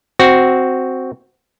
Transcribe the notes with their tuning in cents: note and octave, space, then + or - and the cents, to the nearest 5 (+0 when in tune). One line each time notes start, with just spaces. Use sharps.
C4 +0 F#4 +0